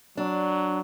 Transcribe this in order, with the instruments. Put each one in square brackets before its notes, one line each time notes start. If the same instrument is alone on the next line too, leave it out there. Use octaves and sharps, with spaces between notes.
[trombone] F#3 [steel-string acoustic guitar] D4